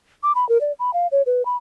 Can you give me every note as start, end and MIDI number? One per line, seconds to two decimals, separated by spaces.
0.23 0.32 86
0.35 0.47 83
0.49 0.60 70
0.61 0.72 74
0.79 0.94 83
0.94 1.07 77
1.12 1.22 73
1.26 1.45 71
1.45 1.57 83